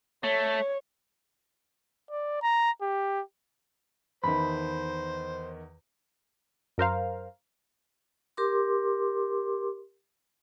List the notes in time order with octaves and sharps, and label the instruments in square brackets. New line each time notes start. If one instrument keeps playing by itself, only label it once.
[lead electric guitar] A3 [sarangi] C#5
[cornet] D5
A#5
G4
[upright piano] E2 D#3 [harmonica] C5 [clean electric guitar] B5
[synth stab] F#2 A#4 C5 F5
[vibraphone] G4 A#4 C6 D6